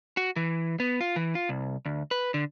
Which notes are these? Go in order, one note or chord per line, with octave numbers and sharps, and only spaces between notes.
F#4
E3
B3
F4
E3
F4
C2
D2
B4
D3